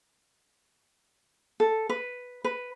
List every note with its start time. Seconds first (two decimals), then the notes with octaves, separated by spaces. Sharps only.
1.60 A4
1.89 B4
2.44 B4